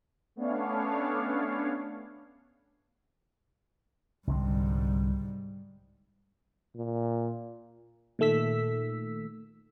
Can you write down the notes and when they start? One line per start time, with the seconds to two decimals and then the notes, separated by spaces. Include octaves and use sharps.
0.36 A3 B3 C#4 D4 C#5 F5
4.27 C2 G#2 D3 G3 C4
6.75 A#2
8.19 A#2 D#3 A3 E6 B6